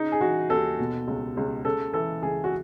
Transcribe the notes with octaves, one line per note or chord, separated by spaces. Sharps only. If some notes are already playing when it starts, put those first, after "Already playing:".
Already playing: C#3 D#4
G#4
E3 F#4
D#2 A4
B2
C#2
C#2
C#3 A4
E3 A4
C#2 G#4
F#4